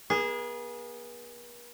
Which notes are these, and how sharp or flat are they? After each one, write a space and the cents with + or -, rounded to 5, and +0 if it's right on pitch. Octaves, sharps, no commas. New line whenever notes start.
B3 -45 G#4 -15